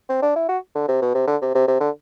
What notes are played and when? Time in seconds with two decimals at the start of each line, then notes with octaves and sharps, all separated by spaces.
0.09 C4
0.22 D4
0.36 E4
0.49 F#4
0.75 D3
0.88 C3
1.02 B2
1.14 C3
1.27 D3
1.41 C3
1.55 C3
1.68 C3
1.80 D3